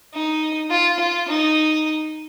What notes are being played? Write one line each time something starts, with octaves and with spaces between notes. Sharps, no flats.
D#4
F4
F4
D#4